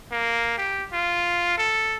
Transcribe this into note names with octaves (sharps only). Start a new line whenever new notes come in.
A#3
G4
F4
A4